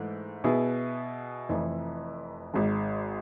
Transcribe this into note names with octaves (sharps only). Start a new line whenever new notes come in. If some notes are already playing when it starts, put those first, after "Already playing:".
Already playing: G#2 E3 A3 E4
B2 B3 E4 G#4
F1 F2 E3
G#1 G#2 G#3